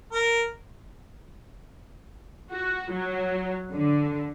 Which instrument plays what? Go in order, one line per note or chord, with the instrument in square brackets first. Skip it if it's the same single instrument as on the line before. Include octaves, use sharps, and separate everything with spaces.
[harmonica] A#4
[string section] F#4
F#3
D3